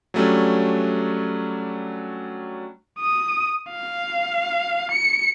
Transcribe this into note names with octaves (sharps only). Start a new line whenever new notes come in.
F#3 G3 A3 C#4 D4
D#6
F5
C#7